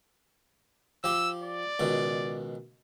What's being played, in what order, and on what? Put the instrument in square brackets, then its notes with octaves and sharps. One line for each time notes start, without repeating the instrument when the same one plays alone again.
[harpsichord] F3 G4 [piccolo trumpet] E6
[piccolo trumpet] D5
[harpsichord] C#2 B2 D#3